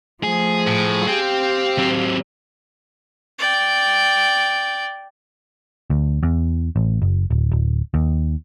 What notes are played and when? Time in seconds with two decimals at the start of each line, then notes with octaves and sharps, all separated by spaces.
0.23 F3 A3 G#4
0.67 A2
1.08 G4 C5 F5 G5
1.78 F#3 C4
3.38 D5 G5
5.90 D2
6.23 E2
6.76 A1
7.02 F#1
7.30 D1
7.52 D1
7.94 D#2